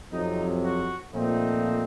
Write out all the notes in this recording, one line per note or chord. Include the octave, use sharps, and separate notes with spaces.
F2 C3 F#3 D#4
F#4
A#2 F3 A3 C4 D#4